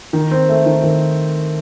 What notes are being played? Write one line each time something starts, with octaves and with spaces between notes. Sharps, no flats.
D#3
C4
A3
D#3
D#3